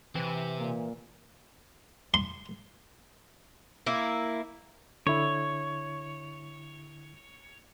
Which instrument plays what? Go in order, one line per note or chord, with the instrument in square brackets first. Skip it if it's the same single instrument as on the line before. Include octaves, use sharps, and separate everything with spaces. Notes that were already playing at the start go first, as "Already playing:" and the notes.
[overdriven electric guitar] C3 C4 [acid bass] E3
[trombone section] A#2 A#3
[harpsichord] C6
[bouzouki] A#3 E4
[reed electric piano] D3 E4 [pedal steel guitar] C#5